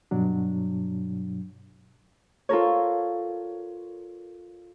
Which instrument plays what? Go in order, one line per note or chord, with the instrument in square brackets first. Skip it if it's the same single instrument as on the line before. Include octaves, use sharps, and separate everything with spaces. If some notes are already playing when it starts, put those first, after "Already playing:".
[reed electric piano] G2 B2 F#3 D4
[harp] F4 A4 A#4 C#5